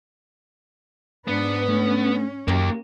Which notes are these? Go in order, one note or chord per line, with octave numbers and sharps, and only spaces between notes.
G#2 B3 D4 B4
A3 C#4 D4
F#2 A#3 G4 A#4